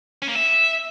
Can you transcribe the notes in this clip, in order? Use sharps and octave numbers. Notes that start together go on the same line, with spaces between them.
C#4
A#3
E5